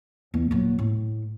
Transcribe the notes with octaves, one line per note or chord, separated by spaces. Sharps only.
E2
D#1 F#3
A2